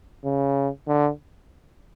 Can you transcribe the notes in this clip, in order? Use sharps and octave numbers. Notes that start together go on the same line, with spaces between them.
C#3
D3